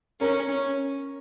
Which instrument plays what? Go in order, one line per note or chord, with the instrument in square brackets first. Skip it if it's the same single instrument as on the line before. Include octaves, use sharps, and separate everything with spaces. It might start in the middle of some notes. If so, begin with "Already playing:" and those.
[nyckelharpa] C#4 [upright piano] A#4
[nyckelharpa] C#4